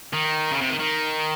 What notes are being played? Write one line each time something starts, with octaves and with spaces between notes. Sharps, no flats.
D#3
C#3
C3
D#3
D#3